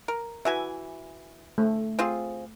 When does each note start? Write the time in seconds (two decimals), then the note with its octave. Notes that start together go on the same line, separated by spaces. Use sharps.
0.08 A#4
0.45 E3 F#4 E5 G#5
1.58 A3
1.99 C4 F4 G#4